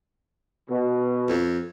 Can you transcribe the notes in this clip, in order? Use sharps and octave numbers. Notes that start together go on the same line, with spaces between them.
B2
F2